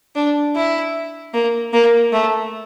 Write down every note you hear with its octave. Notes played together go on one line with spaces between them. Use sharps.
D4
E4
A#3
A#3
A3